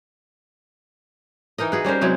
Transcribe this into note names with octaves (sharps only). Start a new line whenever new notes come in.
E3 D#4 A#4 D#5
F#4 G#4 B4
G3 C#4 A#4 C5
C3 F#3 G#3 E4